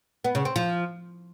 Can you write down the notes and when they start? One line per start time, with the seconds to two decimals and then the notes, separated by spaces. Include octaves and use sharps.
0.24 B3
0.35 C#3
0.45 C4
0.56 F3